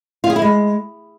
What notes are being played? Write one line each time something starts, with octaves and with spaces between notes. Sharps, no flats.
F4
G#4
E4
G#3